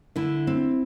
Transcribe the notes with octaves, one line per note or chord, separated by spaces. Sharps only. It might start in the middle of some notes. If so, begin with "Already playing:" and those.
D3 E4
C4